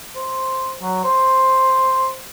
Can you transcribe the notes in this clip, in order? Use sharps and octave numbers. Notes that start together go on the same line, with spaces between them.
C5
F#3
C5